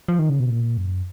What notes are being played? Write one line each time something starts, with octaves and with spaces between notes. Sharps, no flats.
F3
D#3
C#3
B2
A#2
F#2